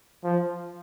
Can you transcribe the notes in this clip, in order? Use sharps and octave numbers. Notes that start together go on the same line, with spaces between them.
F3